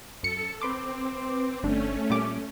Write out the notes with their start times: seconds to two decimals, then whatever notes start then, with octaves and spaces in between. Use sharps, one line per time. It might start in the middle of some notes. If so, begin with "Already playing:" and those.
0.23 F#2 A4 C#7
0.61 C4 B4 C6 D6
1.63 G1 A3 C#4 D4
2.10 A#2 G3 D6